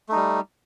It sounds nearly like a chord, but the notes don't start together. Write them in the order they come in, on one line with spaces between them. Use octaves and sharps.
A3 D#4 G3